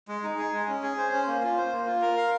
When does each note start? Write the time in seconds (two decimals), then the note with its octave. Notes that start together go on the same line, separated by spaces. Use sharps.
0.08 G#3
0.23 D#4
0.38 G#4
0.53 G#3
0.68 C#4
0.83 G#4
0.98 C5
1.12 C#4
1.28 A#3
1.43 F4
1.58 C5
1.72 A#3
1.87 F4
2.02 A#4
2.17 F5